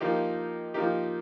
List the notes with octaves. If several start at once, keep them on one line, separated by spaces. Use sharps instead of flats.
F3 A#3 D#4 G4
F3 A#3 D#4 G4